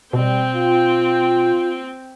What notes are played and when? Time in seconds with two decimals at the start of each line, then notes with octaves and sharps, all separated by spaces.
0.13 B2 G3 C4 G5
0.54 F4